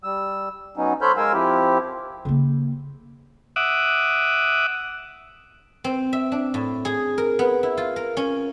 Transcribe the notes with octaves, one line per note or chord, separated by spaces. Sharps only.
G3 E6
F#3 B3 C#4 D#4
A4 C5 C#5 B5 F6 G6
G#3 A#4 F5 G#5 E6
F3 C4 E4 G4
C#3 A#3
E5 F#5 D6 D#6
C4
E5
D4
A2
G#4
A#4
B3
E4
F4
A#4
C#4